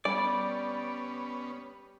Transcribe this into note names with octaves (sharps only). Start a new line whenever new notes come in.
G3 B3 C#4 D5